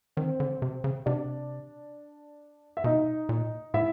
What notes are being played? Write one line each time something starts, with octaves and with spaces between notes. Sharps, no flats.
D#3 C4 C5
D3
C3
C#3
C3 D4 D5
E5
B2 D#4 D#5
A#2
A2 E4 E5